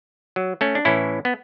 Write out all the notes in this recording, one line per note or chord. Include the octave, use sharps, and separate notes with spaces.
F#3
A3 C#4
D4
A2 E3 C#4 E4
B3